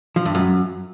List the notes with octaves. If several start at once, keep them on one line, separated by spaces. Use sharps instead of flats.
F3
G2
F#2